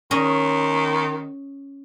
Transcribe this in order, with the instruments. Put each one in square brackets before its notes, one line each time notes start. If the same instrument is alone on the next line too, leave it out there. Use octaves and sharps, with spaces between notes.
[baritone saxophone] D#3 [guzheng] C#4 G#4 D#5